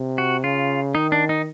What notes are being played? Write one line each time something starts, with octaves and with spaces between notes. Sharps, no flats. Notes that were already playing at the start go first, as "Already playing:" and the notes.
Already playing: C3
F#4
C#3 F4
D#3 D#4
D4
D#4